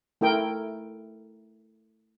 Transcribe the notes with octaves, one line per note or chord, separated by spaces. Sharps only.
A3 E4 A#4 G5